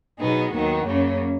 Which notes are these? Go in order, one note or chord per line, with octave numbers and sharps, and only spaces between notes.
B2 F#3 B3 D#4 G#4
D#2 D#3 F#3 B3 F#4
F#2 C#3 F#3 A#3 C#4